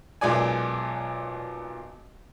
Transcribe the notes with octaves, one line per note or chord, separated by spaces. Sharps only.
B1 A#2 G#3 D5 G#5